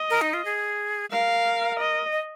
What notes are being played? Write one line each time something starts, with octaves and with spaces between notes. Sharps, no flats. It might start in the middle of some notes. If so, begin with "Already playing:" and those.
Already playing: D#5
A#4
D#4
F4
G#4
A#4 F5
D#5
D#5